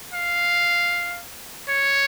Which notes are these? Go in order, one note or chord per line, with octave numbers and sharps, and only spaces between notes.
F5
C#5